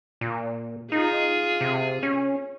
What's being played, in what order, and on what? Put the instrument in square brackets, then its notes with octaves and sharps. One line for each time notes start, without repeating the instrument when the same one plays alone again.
[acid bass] A#2
[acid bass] D#4 [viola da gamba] F4 G#4
[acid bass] C3
C#4